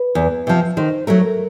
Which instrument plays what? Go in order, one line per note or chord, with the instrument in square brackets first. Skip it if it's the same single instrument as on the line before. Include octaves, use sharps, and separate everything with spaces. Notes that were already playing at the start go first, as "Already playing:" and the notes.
Already playing: [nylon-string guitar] B4
E2
C3 F3
D#3 C5
F#3 A3 A#4